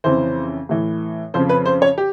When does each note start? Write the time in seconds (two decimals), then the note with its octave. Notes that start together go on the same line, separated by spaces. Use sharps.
0.04 F2 C#3 E3 C5
0.69 A2 E3
1.34 F2 C#3 F3 C5
1.49 B4
1.66 C5
1.82 C#5
1.98 G4